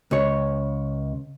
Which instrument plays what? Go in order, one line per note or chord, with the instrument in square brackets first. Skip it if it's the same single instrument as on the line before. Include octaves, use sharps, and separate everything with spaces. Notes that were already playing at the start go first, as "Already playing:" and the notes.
[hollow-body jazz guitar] C#2 C#5